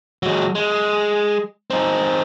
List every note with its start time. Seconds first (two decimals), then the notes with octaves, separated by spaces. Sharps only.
0.23 F#3 G#3
0.55 G#3
1.70 C4 D#4